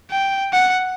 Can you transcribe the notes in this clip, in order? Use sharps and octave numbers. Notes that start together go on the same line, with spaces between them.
G5
F#5